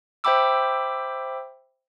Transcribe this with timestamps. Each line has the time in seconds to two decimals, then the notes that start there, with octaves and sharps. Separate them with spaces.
0.24 C5 E5 G5 B5 D6 E6